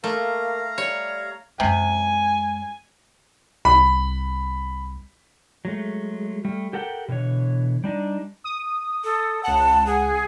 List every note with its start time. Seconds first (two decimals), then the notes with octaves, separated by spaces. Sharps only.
0.04 A3 A#3 F5 A#5
0.78 G3 C#5
1.60 F#2 C3 G#3 G#5
3.65 C2 B5
5.65 F#3 G#3 A3
6.45 G3 A3
6.73 G4 A4 A#4 F#5 G5
7.08 B2 D3 E3 C#5
7.84 G3 D4 D#4
8.44 D#6
9.04 A4
9.43 C#2 F#5 A5
9.86 G#4